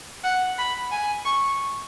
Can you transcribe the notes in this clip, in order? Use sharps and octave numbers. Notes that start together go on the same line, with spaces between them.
F#5
B5
G#5
C#6